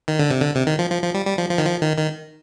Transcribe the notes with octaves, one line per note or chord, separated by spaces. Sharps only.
D#3
D3
C3
D3
C3
D#3
F3
F3
F3
G3
G3
F3
F3
D#3
F3
D#3
D#3